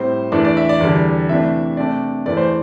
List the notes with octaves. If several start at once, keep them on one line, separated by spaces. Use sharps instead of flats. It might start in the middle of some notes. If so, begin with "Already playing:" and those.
Already playing: A2 G3 C4 C5
E2 E3 A3 D4 D5
D5
E5
D5
E2 D3 G3
C3 E3 A3 D4 E5
C3 A3 D4 D5
E2 E3 A3 D5
C5